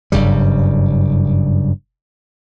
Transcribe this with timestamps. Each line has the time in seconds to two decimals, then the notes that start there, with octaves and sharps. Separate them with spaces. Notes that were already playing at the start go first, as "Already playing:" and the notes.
0.12 F#1 G2 C#3 G3